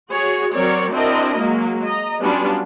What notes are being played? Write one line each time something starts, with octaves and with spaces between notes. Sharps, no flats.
F#4 G#4 C#5
F#3 C4 A#4 C#5 D5
C4 D4 E4 F#4 A#4 D#5
F#3 G#3 A#3
D#5 A#5
F#3 G3 B3 C#4 D4 F4